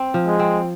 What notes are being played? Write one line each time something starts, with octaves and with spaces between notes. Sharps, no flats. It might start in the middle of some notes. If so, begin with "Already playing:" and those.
Already playing: C4
F3
G#3
C4